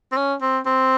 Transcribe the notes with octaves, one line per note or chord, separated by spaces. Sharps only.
C4
C#4
C4
C4